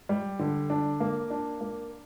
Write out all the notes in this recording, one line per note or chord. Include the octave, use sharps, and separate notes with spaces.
G3
D3
D4
A#3
D4
A#3